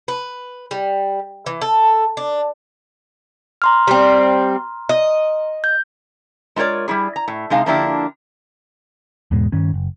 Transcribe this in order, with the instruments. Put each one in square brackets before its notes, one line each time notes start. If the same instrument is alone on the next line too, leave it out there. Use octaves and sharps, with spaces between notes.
[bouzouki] B4
G3
E3
A4
D4
[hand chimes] A#5 C6 F6
[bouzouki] G3 C4
D#5
[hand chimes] G6
[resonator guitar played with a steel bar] G#3 F4 A#4 C#5 D5
G3 G#3 E4 G#4
A#5
A2
C3 G#3 D#4 F5 A5
D3 F3 A#3 D4 E4 G4
[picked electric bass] E2 G#2 B2 G#3
G2 D#3 C#4
F#1